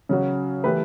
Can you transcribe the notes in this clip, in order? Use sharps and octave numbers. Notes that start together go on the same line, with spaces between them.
C#3 F#3 C#4 F#4
E3 A3 E4 G4 B4